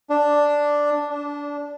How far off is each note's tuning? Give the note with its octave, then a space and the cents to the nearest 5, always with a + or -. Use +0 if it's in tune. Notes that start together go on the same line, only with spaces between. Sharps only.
D4 +0
D4 -20